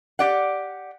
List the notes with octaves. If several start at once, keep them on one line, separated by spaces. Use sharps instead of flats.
G4 D5 F#5